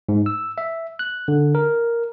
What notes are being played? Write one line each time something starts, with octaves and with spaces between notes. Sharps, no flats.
G#2
E6
E5
F#6
D3
A#4